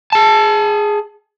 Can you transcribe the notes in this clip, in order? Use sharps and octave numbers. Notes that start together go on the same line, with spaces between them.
G#4 A5